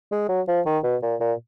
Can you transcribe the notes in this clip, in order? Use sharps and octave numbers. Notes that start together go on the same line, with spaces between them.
G#3
F#3
F3
D#3
B2
A#2
A#2